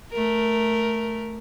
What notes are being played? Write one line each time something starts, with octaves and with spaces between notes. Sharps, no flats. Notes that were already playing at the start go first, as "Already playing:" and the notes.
A3 A#4